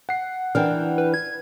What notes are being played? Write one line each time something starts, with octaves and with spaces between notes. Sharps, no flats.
F#5 C7
E3 D4 A#4 F#5 G5 F6
B4
G#6